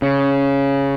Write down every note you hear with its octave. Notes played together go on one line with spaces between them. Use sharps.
C#3